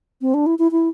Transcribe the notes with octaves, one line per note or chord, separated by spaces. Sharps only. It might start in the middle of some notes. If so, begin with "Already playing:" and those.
C4
D4
E4
E4
E4